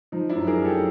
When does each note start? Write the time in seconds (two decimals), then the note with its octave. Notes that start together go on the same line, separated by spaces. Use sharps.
0.12 F3 D#4
0.29 D4 E4
0.35 F#2
0.47 G#4 A#4
0.58 F#2
0.64 G4 A4